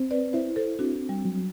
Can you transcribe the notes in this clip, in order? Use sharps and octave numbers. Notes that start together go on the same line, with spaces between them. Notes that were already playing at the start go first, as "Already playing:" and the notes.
Already playing: C4
B4 D5
E4 C5 E5
A4 C5
C4 D4 F#4
G3
F#3